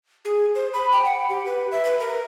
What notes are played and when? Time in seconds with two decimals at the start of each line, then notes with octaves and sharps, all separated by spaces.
0.25 G#4
0.55 C5
0.73 B5
0.92 G5
1.05 F#5
1.29 G4
1.46 B4
1.71 E5
1.85 B4
2.00 A#4